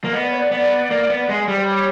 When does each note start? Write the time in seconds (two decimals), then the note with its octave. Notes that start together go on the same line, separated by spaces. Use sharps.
0.04 A#3
0.12 B3 D#5
0.21 D5
0.31 C#5
0.39 D5
0.51 B3
0.91 A#3
1.10 B3
1.29 G#3
1.48 G3
1.56 C5
1.67 C#5